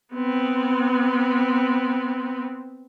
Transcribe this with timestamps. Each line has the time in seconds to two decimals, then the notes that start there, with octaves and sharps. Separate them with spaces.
0.13 B3 C4